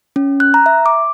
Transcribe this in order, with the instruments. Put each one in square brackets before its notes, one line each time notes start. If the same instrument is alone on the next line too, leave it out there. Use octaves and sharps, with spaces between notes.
[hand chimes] C#4
F#6
A#5
E5
D6